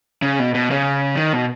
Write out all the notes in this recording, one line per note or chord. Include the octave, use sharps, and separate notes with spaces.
C#3
B2
B2
C#3
D#3
B2